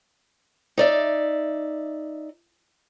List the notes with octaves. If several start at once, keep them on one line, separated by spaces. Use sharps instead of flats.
D#4 D5 E5